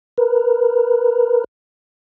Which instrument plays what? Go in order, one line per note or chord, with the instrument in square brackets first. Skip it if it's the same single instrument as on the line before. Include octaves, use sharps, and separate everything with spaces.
[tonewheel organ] A#4 B4